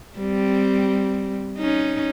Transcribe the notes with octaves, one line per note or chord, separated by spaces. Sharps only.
G3 C4
C#4 D#4